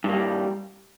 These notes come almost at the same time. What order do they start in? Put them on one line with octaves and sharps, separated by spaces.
G2 A#3 G3